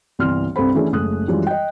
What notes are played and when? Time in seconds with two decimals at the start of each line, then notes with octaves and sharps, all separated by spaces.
0.19 G1 C2 E3 D5 C6 F6
0.56 C2 G2 C4 A4 C5 B5
0.75 E3 A3 C#4 D4 E4 G#4
0.92 F#1 G#3 A3 D#6 F#6
1.28 F#2 E3 F3 G3 G#3
1.47 D#5 G5